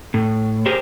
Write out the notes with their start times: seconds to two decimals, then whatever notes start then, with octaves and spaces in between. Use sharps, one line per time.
0.14 A2
0.66 G4 G#4 A#4 C5